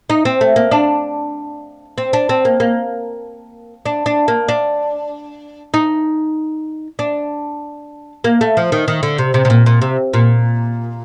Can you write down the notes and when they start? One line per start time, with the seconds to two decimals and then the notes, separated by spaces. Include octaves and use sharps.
0.10 D#4
0.25 C4
0.41 A3
0.56 A#3
0.71 D4
1.98 C4
2.13 D4
2.29 C4
2.45 A#3
2.60 A#3
3.86 D4
4.06 D4
4.28 A#3
4.48 D4
5.74 D#4
6.99 D4
8.24 A#3
8.41 A3
8.57 F3
8.72 D#3
8.88 D#3
9.03 D3
9.18 C3
9.34 C3
9.45 C3
9.50 A#2
9.66 A#2
9.82 C3
10.13 A#2